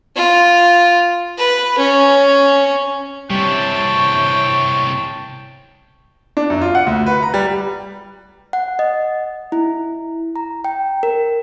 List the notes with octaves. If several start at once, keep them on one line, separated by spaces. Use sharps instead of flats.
F4
B4
C#4
C3 E3 G3 C#5 G5 A5
D4
F#2
F4
F#5
D2
B4
A#5
G3
F#5
D#5
E4
A#5
G5
A#4